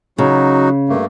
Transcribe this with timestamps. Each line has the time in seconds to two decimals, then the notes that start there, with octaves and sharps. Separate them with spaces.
0.18 C#3 F#3 D#4 F#4
0.89 G2 A3 A#3